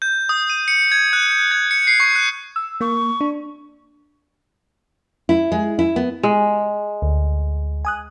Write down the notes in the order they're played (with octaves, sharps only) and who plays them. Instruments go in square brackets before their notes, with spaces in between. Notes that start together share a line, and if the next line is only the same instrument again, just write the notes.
[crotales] G6
D#6
D#7
C#7
G#6
F#6
G6
G#6
C#7
C7
C#6
F#6
[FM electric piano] E6
[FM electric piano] A#3 [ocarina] C#6
[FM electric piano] D4
[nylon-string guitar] E4
G#3
E4
B3
[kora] G#3
[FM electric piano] D2
G#5 D#6 F#6